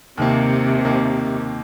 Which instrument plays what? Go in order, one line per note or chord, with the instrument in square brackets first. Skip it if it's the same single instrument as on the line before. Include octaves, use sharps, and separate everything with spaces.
[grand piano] D#2 D#3 A#3 [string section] C3
[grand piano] D#2 D#3 A#3